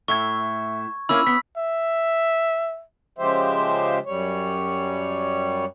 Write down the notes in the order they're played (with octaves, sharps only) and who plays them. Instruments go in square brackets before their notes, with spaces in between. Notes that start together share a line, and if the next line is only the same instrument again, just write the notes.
[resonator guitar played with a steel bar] A2 E5 [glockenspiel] C#6 G#6
[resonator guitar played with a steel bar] A#3 C#4 E4 [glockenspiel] B5 E6
[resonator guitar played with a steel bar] B3 [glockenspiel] B6
[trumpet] E5
[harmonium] C#3 F3 G#3 G4 C5 E5
F#2 G3 C#5